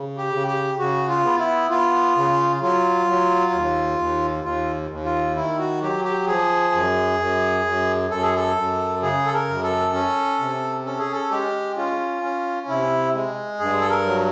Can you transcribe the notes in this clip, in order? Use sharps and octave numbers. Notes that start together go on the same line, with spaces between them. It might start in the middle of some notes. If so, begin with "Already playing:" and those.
Already playing: C#3
G4
C#3
G4
C#3 F#4
F4
B3
E4
B3 F4
C#3
F#3 F4
F#3
D#2
D#2
D#2 F4
D#2
F4
D#3 E4
F#4
F#3 G4
G4
F3 G#4
F#2
F#2
F#2
F#2 A4
G#4
A4
F#2
C#3 G#4
A4
A#4
F#2
A4
C#4
C3
C#4 A4
G#4
A4
G#3 G4
C#4 F4
C#4
C3 E4
G#3
G2 G#4
A4
A#4
F#3